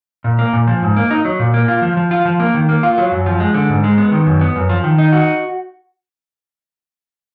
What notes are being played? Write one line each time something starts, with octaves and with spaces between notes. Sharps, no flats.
A#2
A#3
A#2
F3
G#2
A#3
D#4
F#3
A#2
A#3
F4
F3
F3
F4
F3
A#3
D#3
A#3
F4
F#3
F#2
F3
G#3
D3
G#2
G#3
B3
D#3
F#2
B3
F#2
F3
D#3
D#4
F#4